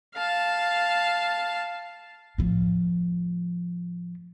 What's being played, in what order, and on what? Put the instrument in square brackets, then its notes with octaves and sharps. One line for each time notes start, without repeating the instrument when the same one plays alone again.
[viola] F5 A5
[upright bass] A2 F3